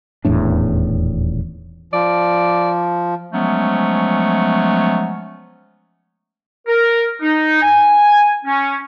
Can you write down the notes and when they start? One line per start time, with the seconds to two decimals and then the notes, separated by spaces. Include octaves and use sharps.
0.25 D#1 E2 A2 D4
1.93 F3 D5
3.33 F3 F#3 G#3 A3 B3 C#4
6.67 A#4
7.20 D#4
7.62 G#5
8.45 C#4